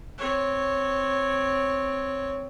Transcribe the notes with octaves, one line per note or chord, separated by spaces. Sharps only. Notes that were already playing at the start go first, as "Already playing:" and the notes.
C4 C#5